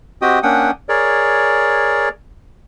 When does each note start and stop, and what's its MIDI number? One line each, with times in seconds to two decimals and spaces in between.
0.22 0.39 60
0.22 0.39 66
0.22 0.39 67
0.22 0.39 75
0.22 0.39 79
0.22 0.39 87
0.43 0.71 58
0.43 0.71 61
0.43 0.71 62
0.43 0.71 78
0.43 0.71 79
0.43 0.71 87
0.89 2.09 68
0.89 2.09 70
0.89 2.09 73
0.89 2.09 74